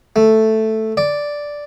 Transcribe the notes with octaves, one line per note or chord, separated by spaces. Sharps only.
A3
D5